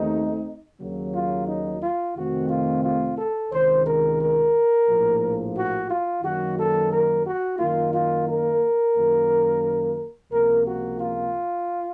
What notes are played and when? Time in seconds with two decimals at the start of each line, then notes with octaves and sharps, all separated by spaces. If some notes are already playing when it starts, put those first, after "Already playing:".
Already playing: D#2 C#3 A3 C4 D#4
0.79 D#2 C#3 F#3 A#3
1.13 F4
1.47 D#4
1.81 F4
2.15 F2 C3 D#3 A3 C4 F#4
2.49 F4
2.83 F4
3.16 A4
3.51 C#2 C3 D#3 C5
3.85 A#4
4.20 A#4
4.87 A#1 A2 F3 A#3
5.55 F#4
5.89 F4
6.23 F#2 D#3 F#3 A#3 F#4
6.57 A4
6.92 A#4
7.25 F#4
7.59 F#2 D#3 A#3 F4
7.93 F4
8.27 A#4
8.95 F#2 D#3 A#3
10.31 C#2 C3 F3 A#3 A#4
10.65 F#4
10.99 F4